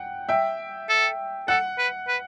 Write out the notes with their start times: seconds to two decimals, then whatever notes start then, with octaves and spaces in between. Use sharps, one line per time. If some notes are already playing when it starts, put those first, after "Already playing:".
Already playing: F#5 G5
0.29 E5 G5
0.89 A4
1.48 A4 F#5
1.78 B4
2.07 B4